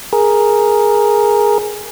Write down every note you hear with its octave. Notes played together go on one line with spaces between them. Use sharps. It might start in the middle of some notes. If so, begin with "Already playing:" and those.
G#4 A#4